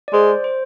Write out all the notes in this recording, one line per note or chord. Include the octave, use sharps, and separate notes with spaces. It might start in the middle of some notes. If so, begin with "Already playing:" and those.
D5
G#3 C5
C5